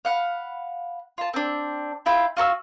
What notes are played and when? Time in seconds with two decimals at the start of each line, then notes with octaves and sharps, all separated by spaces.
0.05 F5 F#5 B5
1.18 F4 A5
1.33 C4 D4
2.06 E4 F4 G5 B5
2.37 F4 F#4 A5 E6